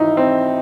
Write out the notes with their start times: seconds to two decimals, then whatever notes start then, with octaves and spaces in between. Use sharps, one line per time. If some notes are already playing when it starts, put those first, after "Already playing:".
Already playing: G#1 G#2 E3 D#4 E4
0.17 C4